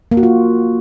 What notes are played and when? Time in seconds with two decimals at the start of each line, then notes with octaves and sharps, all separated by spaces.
0.11 A#3
0.17 F#4
0.23 F4